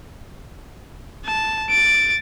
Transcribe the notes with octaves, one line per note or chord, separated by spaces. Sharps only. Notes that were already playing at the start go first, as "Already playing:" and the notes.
A5
A6 D7